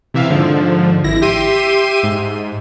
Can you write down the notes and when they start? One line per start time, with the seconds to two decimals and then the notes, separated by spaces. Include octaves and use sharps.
0.14 C3 E3 E5 F5
0.30 G#2 D3 F3
1.04 G#1 E4 A#6
1.22 G4 E5 C6 D#7
2.03 G#2